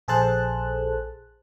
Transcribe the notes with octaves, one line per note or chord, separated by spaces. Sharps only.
A#1 G#4 A4 C5 A5 F#6